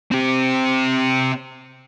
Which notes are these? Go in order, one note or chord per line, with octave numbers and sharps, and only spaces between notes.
C4 G4